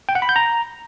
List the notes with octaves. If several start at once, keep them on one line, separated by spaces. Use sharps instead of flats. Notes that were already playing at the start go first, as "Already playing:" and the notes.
G5
F#5
B5
G6
A#5